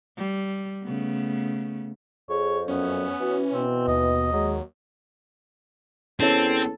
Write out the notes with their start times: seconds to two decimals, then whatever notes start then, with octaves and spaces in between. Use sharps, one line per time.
0.17 G3
0.83 C#3 A3 B3
2.30 F2 G#4 C#5
2.68 F#2 B3 C#4
3.21 E3 F#4
3.53 B2 C4
3.88 D#2 D#5
4.33 F#3 G#3
6.20 E2 C4 C#4 A4 C#5